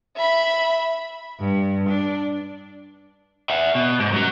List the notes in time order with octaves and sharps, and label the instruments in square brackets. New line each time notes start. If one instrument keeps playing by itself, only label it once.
[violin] E5 B5
[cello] G2
D4
[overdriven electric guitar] E5 F#5
B2
G#2
F#2 F#3